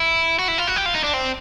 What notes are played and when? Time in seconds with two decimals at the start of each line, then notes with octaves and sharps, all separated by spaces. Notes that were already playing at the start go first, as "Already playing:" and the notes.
Already playing: E4
0.39 F#4
0.48 E4
0.58 F4
0.67 F#4
0.76 G4
0.86 F4
0.95 D#4
1.04 D4
1.14 C4